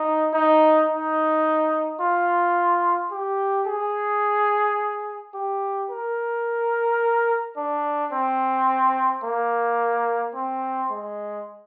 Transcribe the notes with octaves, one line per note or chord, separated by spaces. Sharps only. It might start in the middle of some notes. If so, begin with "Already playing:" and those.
Already playing: D#4
D#4
D#4
F4
G4
G#4
G4
A#4
D4
C4
A#3
C4
G#3